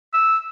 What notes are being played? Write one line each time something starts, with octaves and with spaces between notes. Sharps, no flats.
E6